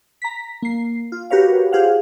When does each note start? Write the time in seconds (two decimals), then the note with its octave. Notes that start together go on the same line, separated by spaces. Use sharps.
0.22 A#5 B6
0.62 A#3 C7
1.12 F4
1.30 F#4 G4 A#4 B4 C#5 F5
1.72 F4 G4 G#4 C5 F5 F#5